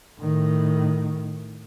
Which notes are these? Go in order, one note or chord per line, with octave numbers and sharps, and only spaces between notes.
A2 D#3